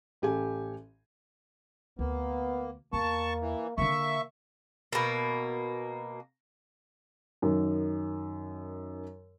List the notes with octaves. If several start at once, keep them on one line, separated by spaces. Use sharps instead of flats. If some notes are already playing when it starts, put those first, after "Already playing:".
A1 G4 A4 G#5
D2 A#3 B3
E2 A#3 B3 A5 C#6
E3
D3 A#3 D4 E5 C#6
B2 A#3
F#2 D#3